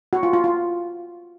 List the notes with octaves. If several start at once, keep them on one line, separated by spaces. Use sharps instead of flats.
F#4
F4
F4
F4